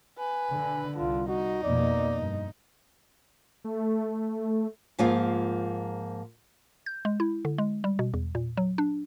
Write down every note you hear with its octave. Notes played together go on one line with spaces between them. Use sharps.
B4 G#5
D3
C2 D3 F4
D#4 F#4
F2 B2 A#3 D5
G2
A3
G#2 F3 A#3 F4 G#4 F5
G6
G#3
E4
D3
G#3
G3
B2
E2
A#2
F#3
D4